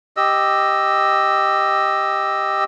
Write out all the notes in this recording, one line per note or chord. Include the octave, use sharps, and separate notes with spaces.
G4 D#5 E6